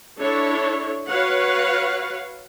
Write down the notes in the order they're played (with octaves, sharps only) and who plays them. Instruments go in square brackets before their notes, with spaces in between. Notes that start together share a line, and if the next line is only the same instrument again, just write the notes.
[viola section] D4 E4 A4 C#5
F#4 B4 C#5 F5 F#5